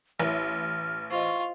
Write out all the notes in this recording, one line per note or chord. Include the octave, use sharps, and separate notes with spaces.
A1 E4 C#5 E5 F6
F4 C5 D#5 C#6